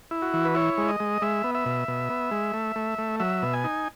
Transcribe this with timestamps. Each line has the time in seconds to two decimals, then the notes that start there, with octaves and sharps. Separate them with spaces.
0.11 E4
0.22 F#4
0.34 E3
0.45 B4
0.55 E4 C#5
0.78 G#3
0.89 D#5
1.00 G#3
1.22 G#3 E5
1.44 B3
1.55 E5
1.66 B2
1.88 B2
2.10 B3
2.31 G#3
2.54 A3
2.76 A3
2.98 A3
3.20 F#3 E5
3.43 B2
3.54 G#5
3.64 D#4